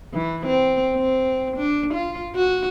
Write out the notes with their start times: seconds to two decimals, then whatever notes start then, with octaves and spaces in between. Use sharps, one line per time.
0.14 E3
0.46 C4
0.95 C4
1.57 D4
1.94 F4
2.36 F#4